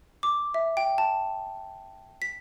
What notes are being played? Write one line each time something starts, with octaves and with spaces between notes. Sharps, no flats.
D6
E5
G5
A5
B6